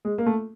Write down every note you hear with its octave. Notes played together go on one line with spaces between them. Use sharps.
G#3
A#3
A3